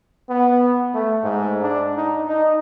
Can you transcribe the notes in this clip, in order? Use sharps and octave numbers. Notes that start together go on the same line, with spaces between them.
B3
A3
G#2
D4
D#4
D#4